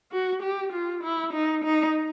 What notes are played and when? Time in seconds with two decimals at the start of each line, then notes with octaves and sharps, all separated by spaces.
0.12 F#4
0.43 G4
0.73 F4
1.03 E4
1.33 D#4
1.64 D#4